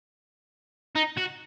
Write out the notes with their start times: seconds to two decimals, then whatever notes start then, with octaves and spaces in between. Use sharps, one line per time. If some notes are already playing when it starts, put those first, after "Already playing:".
0.95 D#4
1.17 F#4